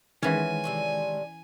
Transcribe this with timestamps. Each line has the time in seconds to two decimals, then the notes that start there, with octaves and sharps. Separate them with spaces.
0.23 D#3 E3 G#3 B3 C#4 G#5
0.64 A2 C3 G3